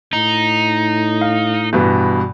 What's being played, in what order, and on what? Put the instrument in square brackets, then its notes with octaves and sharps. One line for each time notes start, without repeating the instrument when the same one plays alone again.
[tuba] A2 [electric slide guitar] D#4
[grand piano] F5
G2 B2 E3